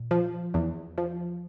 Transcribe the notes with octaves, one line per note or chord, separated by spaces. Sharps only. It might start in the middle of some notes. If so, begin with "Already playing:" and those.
Already playing: A#2
F3
E2
F3